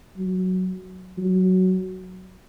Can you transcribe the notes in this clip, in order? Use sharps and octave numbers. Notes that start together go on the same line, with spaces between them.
F#3
F#3